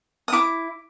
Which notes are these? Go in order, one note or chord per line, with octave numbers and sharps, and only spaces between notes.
D#6
E4 D6